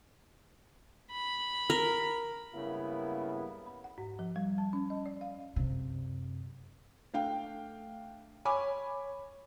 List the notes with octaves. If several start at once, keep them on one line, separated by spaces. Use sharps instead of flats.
B5
A#4
G2 C#3 G#3 A#3 B3 E4
B5
F#5
G#2
F3
G3
A5
C#4
D#5
D5
F5
F#2 C3
A3 D4 F5 G5
C#5 G#5 B5 D6